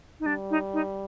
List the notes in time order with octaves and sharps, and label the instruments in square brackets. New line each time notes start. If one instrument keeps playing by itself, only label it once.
[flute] D#4
[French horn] G3 [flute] D4
[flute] D#4
D#4